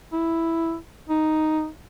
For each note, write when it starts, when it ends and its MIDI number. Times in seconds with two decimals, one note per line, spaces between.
0.13 0.76 64
1.10 1.68 63